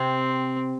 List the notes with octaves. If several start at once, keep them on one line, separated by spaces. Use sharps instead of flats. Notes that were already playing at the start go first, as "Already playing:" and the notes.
Already playing: C3 C4